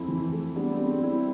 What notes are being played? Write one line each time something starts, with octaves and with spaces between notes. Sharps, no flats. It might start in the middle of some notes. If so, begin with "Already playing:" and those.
Already playing: F2 C4 E4
E3
A3
G3 B3 D4
C4
G3
C4
G3 C4 E4